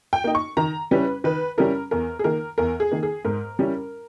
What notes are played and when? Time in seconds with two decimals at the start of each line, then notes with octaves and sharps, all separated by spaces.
0.13 G5
0.24 A#3 D#4
0.35 C#6
0.57 D#3 A#5
0.91 G3 C#4 E4 B4
1.24 D#3 B4
1.58 G3 C#4 E4 A#4
1.91 E2 A#4
2.19 G#4
2.24 D#3 A#3 A#4
2.58 E2 A#4
2.80 G#4
2.92 D#3 A#3
3.03 G#4
3.25 G#2 A#4
3.59 G3 C#4 E4